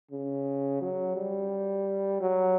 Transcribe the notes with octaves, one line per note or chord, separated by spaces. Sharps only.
C#3
F#3
G3
F#3